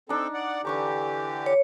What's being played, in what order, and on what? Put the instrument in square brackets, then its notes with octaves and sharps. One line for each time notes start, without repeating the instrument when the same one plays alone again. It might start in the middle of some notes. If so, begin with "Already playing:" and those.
[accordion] C4 A4 [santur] D4 D#4
[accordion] D5 F#5
[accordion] D3 E3 G4 [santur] A#5 C#6 D6
[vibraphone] C#5